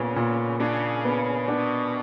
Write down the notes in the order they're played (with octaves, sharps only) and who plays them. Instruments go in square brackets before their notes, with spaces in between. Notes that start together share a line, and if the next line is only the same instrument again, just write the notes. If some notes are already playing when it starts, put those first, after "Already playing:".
Already playing: [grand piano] A#2 B3 [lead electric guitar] C#3
[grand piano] A#2
[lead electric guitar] C#3 [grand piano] D4
[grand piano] B3
[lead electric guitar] B2 [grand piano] D4